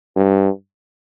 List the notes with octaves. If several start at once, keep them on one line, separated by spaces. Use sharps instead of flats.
G2